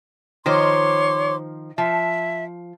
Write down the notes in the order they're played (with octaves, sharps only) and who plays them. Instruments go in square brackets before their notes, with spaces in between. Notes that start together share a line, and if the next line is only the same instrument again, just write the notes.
[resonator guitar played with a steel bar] D#3 F3 C5 [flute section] C#5 C6 D6
[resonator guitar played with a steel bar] F3 [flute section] E5